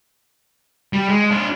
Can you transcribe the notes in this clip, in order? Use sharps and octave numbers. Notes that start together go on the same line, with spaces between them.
G3
G#3
D4 F4